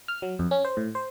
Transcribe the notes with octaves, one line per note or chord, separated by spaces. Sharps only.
F6
F#3
F2
C#4
C5
A2
C5